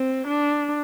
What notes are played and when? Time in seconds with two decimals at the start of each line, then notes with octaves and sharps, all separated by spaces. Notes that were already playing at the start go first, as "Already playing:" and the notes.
Already playing: C4
0.27 D4